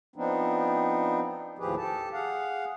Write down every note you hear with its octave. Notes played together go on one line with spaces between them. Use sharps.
F3 B3 C4 D4 D#4
D#2 A2 F3 G4 G#4 B4
G4 A4 A5
G#4 F5 F#5